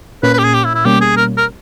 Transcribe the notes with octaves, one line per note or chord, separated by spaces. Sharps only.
A#2 A#3 C#4 B4
B4
G4
G#4
G4
E4
E4
B2 G3 A#3 C#4 G4
G#4
A#4
A#4